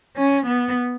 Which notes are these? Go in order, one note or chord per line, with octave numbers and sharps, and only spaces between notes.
C#4
B3